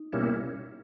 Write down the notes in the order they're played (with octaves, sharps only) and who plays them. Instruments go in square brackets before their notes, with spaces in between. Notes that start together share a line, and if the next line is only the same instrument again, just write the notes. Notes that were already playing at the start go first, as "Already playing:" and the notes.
Already playing: [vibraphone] D#4
[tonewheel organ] B2 G3 A#3 C#4 E4